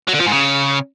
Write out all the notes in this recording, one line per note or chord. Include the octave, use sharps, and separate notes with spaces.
F#3
D3
F3
G#2
C#3